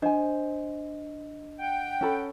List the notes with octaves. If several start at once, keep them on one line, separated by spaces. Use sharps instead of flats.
D4 C5 D#5 G#5
F#5 G5
C#4 A4 B5